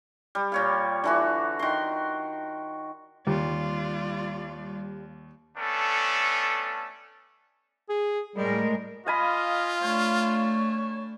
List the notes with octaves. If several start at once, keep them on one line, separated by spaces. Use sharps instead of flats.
G3
A#2 C#5 F5
D3 E3 F#4
D#3 C6
D#2 G3 F4 D5
A3 B3 C#4 D4 A4
G#4
A2 G3 G#3 A#4
F4 D#5 F5 G#5 B5
A3 D4 C#5